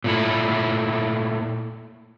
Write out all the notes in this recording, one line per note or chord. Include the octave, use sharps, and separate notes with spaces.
A#2 A3 E4